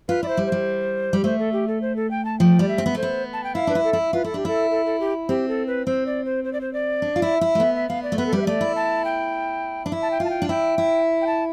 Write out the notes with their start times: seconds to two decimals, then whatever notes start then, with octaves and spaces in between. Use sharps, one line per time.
0.08 F4 B4
0.23 E4 D5
0.28 C5
0.37 G3
0.46 C5
0.52 G3
1.13 G3
1.24 A3 C5
1.39 A4
1.53 G4
1.68 A4
1.82 C5
1.96 A4
2.11 G5
2.25 A5
2.40 F3 G5
2.59 G3 D5
2.68 E5
2.78 C4
2.86 B3
2.95 A3 C5
3.03 B3
3.33 A5
3.44 G5
3.55 E4 F5
3.67 D4 B4
3.75 E4
3.84 A4
3.93 E4
4.13 F4 B4
4.24 E4 A4
4.34 D4 G4
4.45 E4 A4
4.71 A4
4.86 A4
5.00 G4
5.29 C4 G4
5.48 A4
5.67 B4
5.86 C4 C5
6.06 D5
6.25 C5
6.44 C5
6.53 D5
6.61 C5
6.73 D5
7.02 D4
7.16 F4
7.22 E4
7.41 E4
7.55 A3
7.60 B3 E5
7.75 E5
7.89 B3 F5
8.03 D5
8.12 A3
8.18 B3 B4
8.27 A4
8.33 G3 B4
8.42 E5
8.46 A3 D5
8.61 E4
8.76 A5
9.05 G5
9.86 D4
9.92 E4
10.02 A5
10.11 G5
10.20 F4 A5
10.30 G5
10.42 D4
10.49 E4 G5
10.78 E4
11.22 G5
11.27 A5